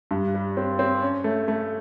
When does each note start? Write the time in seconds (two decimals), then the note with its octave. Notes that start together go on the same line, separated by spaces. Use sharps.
0.11 G2
0.34 G3
0.57 C4
0.79 C4
1.02 C#4
1.24 A3
1.48 A3